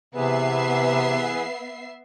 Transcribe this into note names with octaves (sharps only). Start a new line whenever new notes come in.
C3 E3 B3 G#4 B4 E5 C7